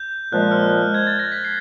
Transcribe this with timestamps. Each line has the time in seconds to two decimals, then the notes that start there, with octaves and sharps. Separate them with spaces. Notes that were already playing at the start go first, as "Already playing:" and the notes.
Already playing: G6
0.32 A#2 F3 G#3 F#6
0.51 F6
0.70 F#6
0.94 G#6
1.07 A6
1.19 A#6
1.32 B6
1.45 C7